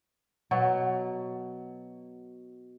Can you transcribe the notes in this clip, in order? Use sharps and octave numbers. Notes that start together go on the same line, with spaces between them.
B2 F#3